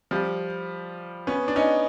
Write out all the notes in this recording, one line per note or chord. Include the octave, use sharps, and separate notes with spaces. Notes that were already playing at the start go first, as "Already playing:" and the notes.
F3 G3
B3 C#4
D4
C#4 D#4